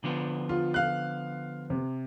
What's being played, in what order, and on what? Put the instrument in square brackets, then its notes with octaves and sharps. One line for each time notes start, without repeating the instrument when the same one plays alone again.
[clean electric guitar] D3 F3 B3
[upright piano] F4
F5 F#6
C3